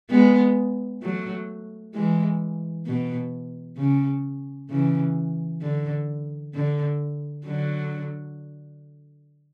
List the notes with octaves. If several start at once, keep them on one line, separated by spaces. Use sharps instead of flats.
G#3 B3
F#3 A3
E3 G#3
B2
C#3
C#3 E3
D3
D3
D3 F#3